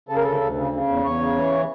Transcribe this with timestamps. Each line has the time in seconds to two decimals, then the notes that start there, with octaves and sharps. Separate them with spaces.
0.09 C#3 A4
0.16 A#4
0.24 D2 A4
0.41 D2
0.56 C#3
0.72 C#3
0.88 E2
1.04 E2 C#5
1.20 C#3
1.36 E3